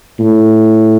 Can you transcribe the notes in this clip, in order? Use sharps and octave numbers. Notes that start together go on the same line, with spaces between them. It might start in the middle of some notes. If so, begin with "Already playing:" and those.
A2